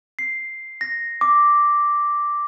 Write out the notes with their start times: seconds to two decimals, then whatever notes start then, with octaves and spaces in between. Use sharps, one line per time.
0.19 C7
0.81 A#6
1.21 D6